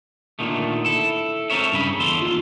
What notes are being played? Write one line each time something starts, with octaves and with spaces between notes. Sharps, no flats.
A#2 D3 D#3 A3
E4 A4
C4 A4 A#4 C#5 E5
G2 C#3 B5
E2 A4 C6
D#2 F4